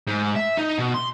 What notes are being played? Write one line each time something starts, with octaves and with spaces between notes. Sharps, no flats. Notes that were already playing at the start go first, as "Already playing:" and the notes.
G#2
E5
D#4
B2
C6